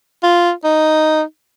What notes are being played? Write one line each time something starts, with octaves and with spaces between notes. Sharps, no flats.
F4
D#4